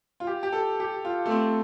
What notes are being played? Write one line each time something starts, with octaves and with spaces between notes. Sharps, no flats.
F4
G4
G4
A4
G4
F4
A3
C4